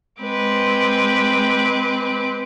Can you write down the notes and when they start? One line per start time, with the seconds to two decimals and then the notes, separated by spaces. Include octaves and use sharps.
0.22 G#3 C4 B4 D6